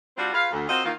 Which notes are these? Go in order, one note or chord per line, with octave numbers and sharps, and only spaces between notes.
G3 C4 D4 F4 F#4
F4 G#4 B4 F5
D2
C4 F4 F#4 A#4 D#5
D#3 E3 A#3 F4